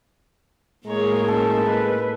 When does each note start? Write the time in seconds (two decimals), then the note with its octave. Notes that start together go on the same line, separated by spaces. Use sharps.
0.87 A2 G#3 A#3 G#4 C#5 A#5
1.28 C#4 D#4 A4 A5
1.62 B4